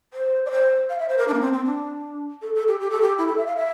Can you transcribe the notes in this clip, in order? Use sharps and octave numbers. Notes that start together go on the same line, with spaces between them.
C5
D5
C5
F5
E5
C5
A#4
D4
A#3
C4
C4
D4
A4
A4
G4
G4
A4
G4
E4
A4
E5
F5
E5